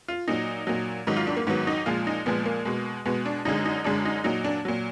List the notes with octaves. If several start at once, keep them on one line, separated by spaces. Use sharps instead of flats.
F4
A#2 F#3 D#4
A#2 F#3
G#2 D#3 F#3 D#4
F4
D4
A#3
G#2 D#3 F#3 B3
D#4
A#2 F3 G#3 F4
D#4
A#2 F3 G#3 B3
A#3
B2 G#3
B2 G#3 B3
D4
F#2 D3 G#3 D#4
D#4
F#2 D3 G#3 D4
D#4
A#2 F#3 D#4
D4
A#2 F#3